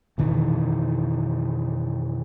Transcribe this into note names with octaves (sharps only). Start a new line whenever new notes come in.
F2 B2 D#3 E3